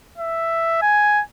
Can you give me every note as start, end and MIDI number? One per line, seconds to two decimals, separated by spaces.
0.18 0.78 76
0.82 1.22 80